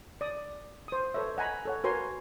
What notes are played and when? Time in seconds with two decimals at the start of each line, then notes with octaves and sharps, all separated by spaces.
0.21 D5 D#6
0.88 C5 D#6
1.14 A4 B4 C#5 E5
1.37 D#5 F#5 G#5 A#5 B5
1.65 A4 C#5 F#5
1.84 F#4 A#4 B4 C#5 G#5 C6